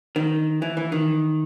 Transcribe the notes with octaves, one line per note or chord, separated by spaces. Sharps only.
D#3
E3
E3
D#3